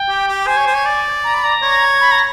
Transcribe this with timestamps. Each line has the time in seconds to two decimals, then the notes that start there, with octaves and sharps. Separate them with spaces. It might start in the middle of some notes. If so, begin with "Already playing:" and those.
Already playing: G5
0.09 G4
0.28 G4
0.47 C5 G#5
0.57 C#5
0.66 C5
0.75 C#5
0.85 D5
1.24 A#5
1.34 B5
1.44 A#5
1.62 C#5
2.01 B5
2.11 A#5